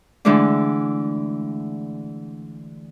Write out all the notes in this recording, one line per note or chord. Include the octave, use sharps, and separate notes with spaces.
D3 E3 G#3 A3 D4